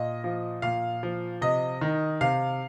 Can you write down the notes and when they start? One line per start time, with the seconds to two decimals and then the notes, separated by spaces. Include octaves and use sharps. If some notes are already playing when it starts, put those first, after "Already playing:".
Already playing: A#2 D#5
0.24 F3
0.62 A#2 F5
1.03 F3
1.41 C3 D#5
1.81 D#3
2.21 C3 F5